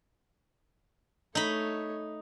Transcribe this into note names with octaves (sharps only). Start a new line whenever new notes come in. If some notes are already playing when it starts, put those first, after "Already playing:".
A3 D#4 C#5 B5